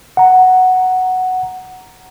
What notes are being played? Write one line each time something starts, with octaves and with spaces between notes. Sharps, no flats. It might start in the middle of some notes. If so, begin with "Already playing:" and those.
F#5 A#5